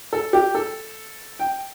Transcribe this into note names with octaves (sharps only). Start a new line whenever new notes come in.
A4
G4
A4
G5